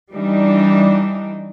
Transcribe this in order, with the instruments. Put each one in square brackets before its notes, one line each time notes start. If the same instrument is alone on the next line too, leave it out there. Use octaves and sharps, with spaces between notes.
[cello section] E3 G3 D4 D#4